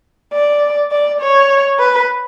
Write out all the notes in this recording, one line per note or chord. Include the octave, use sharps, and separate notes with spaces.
D5
D5
C#5
B4